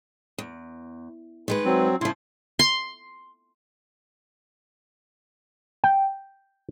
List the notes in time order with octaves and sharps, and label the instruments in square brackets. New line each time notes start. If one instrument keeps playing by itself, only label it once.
[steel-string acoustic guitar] E2
D#3 G#3 B4
[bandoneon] F#3 C4
[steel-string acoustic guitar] C#3 F3 [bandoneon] E4 C6
[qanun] C6
[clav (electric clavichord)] G5